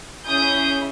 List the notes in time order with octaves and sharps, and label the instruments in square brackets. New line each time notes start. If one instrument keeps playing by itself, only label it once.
[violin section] C#4 E4 G#4 D#6 G6